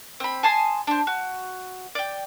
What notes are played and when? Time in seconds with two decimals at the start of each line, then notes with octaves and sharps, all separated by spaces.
0.20 C4 B5
0.43 G#5 A5 C6 D#6
0.87 D4 C5
1.07 F#4
1.95 D5 G5